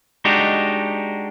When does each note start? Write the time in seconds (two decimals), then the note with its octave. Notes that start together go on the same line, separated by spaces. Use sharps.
0.25 G#3 D4 D#4 F#4 G4